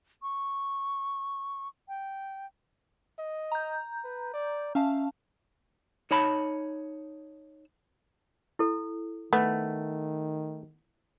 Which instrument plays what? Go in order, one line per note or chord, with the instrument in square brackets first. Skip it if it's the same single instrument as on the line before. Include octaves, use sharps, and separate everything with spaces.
[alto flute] C#6
G5
[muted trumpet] D#5
[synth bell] A#5 G6
[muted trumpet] B4
D5
[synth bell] C#4 F5 A5 [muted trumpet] E5
[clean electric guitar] D#4 C#5 A5 B5
[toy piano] E4 A4
[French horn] D#3 [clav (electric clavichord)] A3 [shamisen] B3